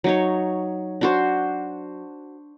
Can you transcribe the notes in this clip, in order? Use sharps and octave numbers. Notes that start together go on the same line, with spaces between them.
F#3 D#4 C#5
D4 F#4 C5